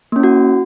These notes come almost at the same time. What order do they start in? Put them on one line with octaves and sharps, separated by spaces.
A#3 C#4 E4 F#4